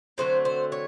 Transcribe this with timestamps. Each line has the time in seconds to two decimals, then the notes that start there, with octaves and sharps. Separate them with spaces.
0.18 D3 F#3 A3 C4 C5
0.45 C5
0.72 C#5